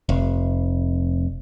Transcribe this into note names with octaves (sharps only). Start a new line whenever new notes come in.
F1